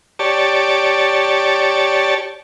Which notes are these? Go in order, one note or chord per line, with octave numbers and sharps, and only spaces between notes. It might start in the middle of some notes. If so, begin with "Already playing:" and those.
G4 C#5 D5 A5